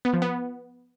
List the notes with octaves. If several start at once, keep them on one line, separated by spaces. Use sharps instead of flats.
B3
F3
B3